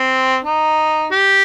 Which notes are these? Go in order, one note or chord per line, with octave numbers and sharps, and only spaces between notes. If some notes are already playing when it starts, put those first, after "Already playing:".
Already playing: C4
D#4
G4